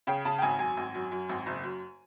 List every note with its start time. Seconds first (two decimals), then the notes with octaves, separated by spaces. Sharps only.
0.07 C#3 G5
0.25 C#3 A5
0.38 G5
0.42 G#1 G#5
0.59 F#2 G#5
0.77 G#1
0.94 F#2
1.12 F#2
1.29 G#1
1.46 F#1
1.63 F#2